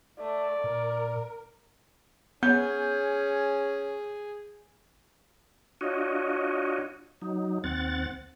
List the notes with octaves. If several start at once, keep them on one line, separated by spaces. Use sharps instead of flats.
A3 D5
A#2 A#4
B3 C#4 G#4 C#5 G6
D4 F4 F#4 C#5 D#5
F#3 D#4
D#2 C4 F#5 A6